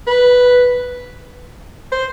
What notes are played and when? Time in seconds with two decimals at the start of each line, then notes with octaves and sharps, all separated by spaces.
0.07 B4
1.92 C5